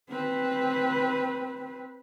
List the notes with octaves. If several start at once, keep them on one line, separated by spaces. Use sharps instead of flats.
C4 B4